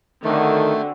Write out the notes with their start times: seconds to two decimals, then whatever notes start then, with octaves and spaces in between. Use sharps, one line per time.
0.24 D3 D#3 A3 C4 D4 F#4